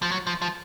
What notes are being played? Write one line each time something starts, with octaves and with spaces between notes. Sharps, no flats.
F3
F#3
F3
F3